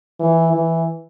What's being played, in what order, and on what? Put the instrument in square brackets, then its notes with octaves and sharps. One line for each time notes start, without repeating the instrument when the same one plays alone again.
[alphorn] E3
E3